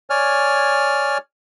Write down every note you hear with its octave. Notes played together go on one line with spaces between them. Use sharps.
C#5 D5 G#5 F6